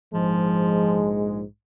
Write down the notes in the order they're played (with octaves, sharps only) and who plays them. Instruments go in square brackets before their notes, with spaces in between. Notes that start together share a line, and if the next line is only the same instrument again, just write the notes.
[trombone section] A#1 G#2 G#3 [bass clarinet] F3